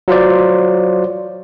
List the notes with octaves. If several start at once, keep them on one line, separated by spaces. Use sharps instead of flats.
F#3 F4 C5 D5